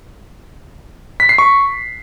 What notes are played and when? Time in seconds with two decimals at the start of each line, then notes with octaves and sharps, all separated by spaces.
1.20 B6
1.29 C7
1.38 C#6